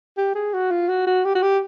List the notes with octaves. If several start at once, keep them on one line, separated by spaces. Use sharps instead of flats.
G4
G#4
F#4
F4
F#4
F#4
G4
F#4
G4